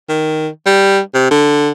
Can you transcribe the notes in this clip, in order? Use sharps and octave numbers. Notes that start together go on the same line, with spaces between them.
D#3
G3
C3
D3